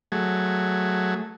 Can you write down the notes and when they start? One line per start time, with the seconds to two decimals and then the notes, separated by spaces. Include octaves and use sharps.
0.12 F#3 A3 G#4